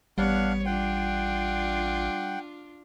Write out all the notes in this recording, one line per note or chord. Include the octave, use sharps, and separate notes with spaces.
A1 G3 B3 D4 C#5 F5 F#5
D4 F4 F#5 G5